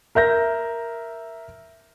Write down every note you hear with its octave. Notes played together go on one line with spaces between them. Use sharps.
A#4 E5 G6 A#6